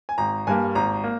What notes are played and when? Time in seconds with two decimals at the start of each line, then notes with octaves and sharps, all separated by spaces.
0.09 G#5
0.18 G#1 A#5
0.47 G2 G3 A#3 G#5
0.75 G#1 A#5
1.04 A#3